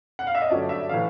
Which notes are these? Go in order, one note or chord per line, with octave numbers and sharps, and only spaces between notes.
F#5
F5
E5
D#5
G2 D3 F#3 A3 C#4 D5
E5
A2 E3 A3 F5